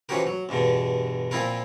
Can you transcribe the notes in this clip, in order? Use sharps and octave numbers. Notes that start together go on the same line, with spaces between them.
E3 F3 C#4 F#4 G4 A#4
F#3
E2 G2 B2 D3
A#2 F3 C4 E4 F4 A#4